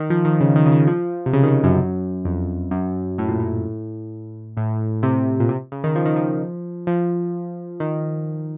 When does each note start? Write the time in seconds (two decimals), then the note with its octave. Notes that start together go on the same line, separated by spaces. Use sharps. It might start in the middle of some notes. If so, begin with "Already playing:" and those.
Already playing: D#3
0.10 F3
0.25 D#3
0.40 C#3
0.56 D#3
0.66 C#3
0.72 D#3
0.87 F3
1.26 C3
1.33 C#3
1.43 D#3
1.48 C#3
1.64 F#2
1.79 F#2
2.25 F2
2.71 F#2
3.18 A2
3.29 A#2
3.40 A2
4.57 A2
5.03 C3
5.40 A#2
5.49 C3
5.72 C#3
5.84 D#3
5.95 F3
6.05 D#3
6.16 F3
6.87 F3
7.80 D#3